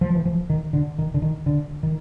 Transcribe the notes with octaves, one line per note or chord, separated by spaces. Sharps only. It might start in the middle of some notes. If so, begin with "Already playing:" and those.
F3
E3
F3
D#3
D3
D#3
D3
D#3
D3
D#3